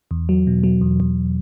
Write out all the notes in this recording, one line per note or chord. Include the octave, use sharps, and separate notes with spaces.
E2
F#3
B2
F#3
E2
E2